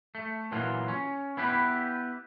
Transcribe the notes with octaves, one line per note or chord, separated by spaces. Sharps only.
A3
A#2 E3 F#3 F4
C#4
B3 E4 G4 B4